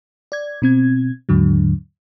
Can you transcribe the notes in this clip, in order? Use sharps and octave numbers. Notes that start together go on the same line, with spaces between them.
D5 G#6
B2 C4 G#6
D#2 G#2 D3 F#3